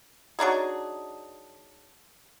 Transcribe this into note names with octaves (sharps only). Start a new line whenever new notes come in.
F#3 D4 D#4 G#4